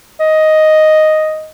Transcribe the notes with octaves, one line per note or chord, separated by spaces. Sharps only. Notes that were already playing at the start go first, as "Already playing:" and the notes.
D#5